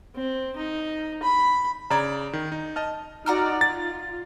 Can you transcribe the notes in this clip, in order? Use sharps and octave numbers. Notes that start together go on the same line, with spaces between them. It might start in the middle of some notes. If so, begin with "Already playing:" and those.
C4
D#4
B5
C#3 D5 A#5 G#6
D#3
D#4
D#5 A5 F6
D#4 F#4 D5 F#5 A#5 F6
F4 A6